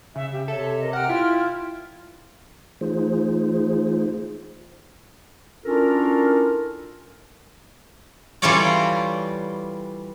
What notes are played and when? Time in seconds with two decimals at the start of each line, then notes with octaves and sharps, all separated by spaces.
0.16 C#3 E5
0.31 G4
0.48 C3 A4 C#5 E5
0.81 A#4 D#5
0.93 F#5 G5 F6
1.09 E4 F4
2.81 E3 A3 D#4 F4 G#4 C5
5.65 C#4 D4 E4 F4 A4 A#4
8.42 E3 G3 F4 A4 C#5 D5